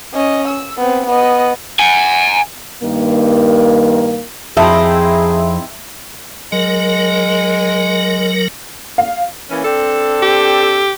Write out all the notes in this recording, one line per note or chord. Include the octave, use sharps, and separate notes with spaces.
C#4 D#5
E6
B3 C4
B3 D#5
F#5 G#5
G2 D#3 A#3
F2 C4 D#4 E4 G#4 E5 A5
F#3 G#3 A#4
F5
E3 A#3 C#4
C4 D4 A4
G4